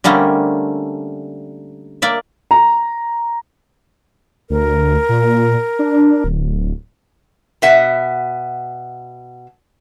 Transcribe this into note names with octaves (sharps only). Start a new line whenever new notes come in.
D3 G3 A3 A#3 C4 C#4
A#3 D5 E5
A#5
D2 A#4
A#2
D4
D1
B2 E5 F#5